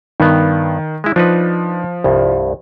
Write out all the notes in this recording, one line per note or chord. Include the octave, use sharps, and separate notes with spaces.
G2 D#3 B3
G#3 E4
F3 D4 D#4 B4
C2 G2